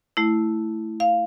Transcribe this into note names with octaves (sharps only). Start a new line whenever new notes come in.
A3 E4
F5